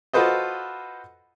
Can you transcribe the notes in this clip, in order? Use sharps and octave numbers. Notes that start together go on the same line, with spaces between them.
F4 F#4 A4 B4 C5 D#5